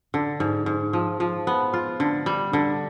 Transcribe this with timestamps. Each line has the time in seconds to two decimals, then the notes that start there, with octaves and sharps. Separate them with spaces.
0.14 D3
0.40 G#2
0.66 G#2
0.93 F3
1.20 F3
1.47 B3
1.74 F4
2.00 D3
2.26 G3
2.53 D3